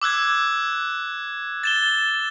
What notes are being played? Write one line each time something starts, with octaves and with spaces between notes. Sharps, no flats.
D6 E6 F#6 G#6
A6 E7 G7